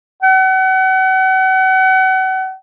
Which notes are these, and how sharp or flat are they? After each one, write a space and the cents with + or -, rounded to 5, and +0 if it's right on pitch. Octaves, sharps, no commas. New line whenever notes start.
F#5 +35